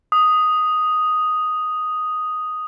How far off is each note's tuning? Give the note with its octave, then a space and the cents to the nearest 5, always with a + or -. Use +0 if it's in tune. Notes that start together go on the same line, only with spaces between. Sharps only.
D#6 +0